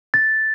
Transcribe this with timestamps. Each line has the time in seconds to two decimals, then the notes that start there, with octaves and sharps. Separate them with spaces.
0.14 A6